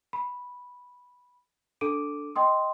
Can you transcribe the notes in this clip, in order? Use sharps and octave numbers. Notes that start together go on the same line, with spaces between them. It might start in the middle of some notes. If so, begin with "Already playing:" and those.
B5
D4 A4 D6 D7 D#7
D#5 G5 C6 D#6